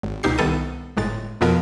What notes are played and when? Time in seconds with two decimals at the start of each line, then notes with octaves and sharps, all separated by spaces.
0.03 G#1
0.23 C#2 B2 D#4 G4 C7
0.38 C2 D#3 B3 A4 D#7
0.97 G1 A2 G#3 A6
1.41 F2 B2 F3 B3 A#4